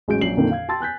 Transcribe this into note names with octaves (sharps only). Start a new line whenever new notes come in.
A1 G#3 F#4 G#4 G6 D7
A#1 F#3 C7 F#7
F2 A#2 D3 D#3
F5 G#6
G5 A5 C6 E6 A6
G#5 F#6 G6 B6